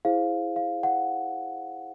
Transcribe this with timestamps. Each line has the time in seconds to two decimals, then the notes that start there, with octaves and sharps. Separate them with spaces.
0.05 E4 G#4 C5 F5
0.56 F5
0.83 F#5